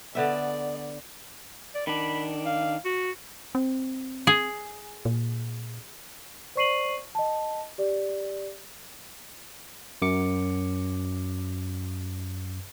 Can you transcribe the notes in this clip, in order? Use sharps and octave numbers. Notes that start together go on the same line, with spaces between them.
D3 B3 D5 E5
D5
D#3 D4 B5
F5
F#4
C4
G#4
A#2
C5 D5 C#6 C7 D#7 F#7
D#5 A5
G4 D5
F#2 D6 C#7